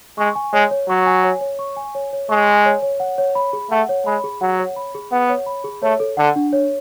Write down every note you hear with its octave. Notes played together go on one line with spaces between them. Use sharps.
G#3 C#6
G#5
G#3 C#5
C#5
F#3 C#6
G#5
C#5
C#5
C#6
G#5
C#5
C#5
G#3 C#6
G#5
C#5
C#5
F#5
C#5
B5
G#4
A3 F#5
C#5
G#3 B5
G#4
F#3 F#5
C#5
B5
G#4
B3 F#5
C#5
B5
G#4
A3 C#5
A4
D3 F#5
D4
C#5